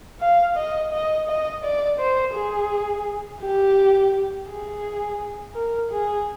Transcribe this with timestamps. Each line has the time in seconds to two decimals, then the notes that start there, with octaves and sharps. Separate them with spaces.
0.21 F5
0.56 D#5
0.93 D#5
1.28 D#5
1.63 D5
1.99 C5
2.34 G#4
3.40 G4
4.48 G#4
5.54 A#4
5.90 G#4